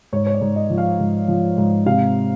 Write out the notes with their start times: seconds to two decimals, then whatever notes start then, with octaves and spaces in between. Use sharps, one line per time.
0.13 G#2 C#5
0.27 C#5
0.34 D5
0.41 G#2
0.56 D#5
0.70 F3
0.78 F5
1.00 G#2
1.28 F3
1.58 G#2
1.86 C3 F5